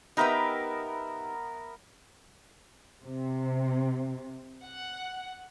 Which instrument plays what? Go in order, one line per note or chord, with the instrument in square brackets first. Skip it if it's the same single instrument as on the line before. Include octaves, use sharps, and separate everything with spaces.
[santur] B3 A#4 E5 [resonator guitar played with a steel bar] D#4 G4 B4
[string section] C3
F#5